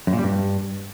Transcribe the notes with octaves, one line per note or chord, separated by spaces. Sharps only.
F#2
A#2
G3
G2